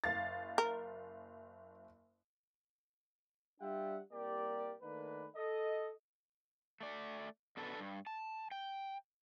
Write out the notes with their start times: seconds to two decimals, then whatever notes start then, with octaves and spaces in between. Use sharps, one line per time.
0.04 F#1 F5 A6
0.58 A#4
3.60 G3 D4 F4 E5 F#5 G5
4.12 C2 A#3 G4 A#4 D5
4.82 D#3 A3 A#3 D4 B4
5.36 A4 D#5
6.81 A3 D5
7.57 B2 D4 A4 B4 A5
7.80 G2
8.07 A5
8.51 G5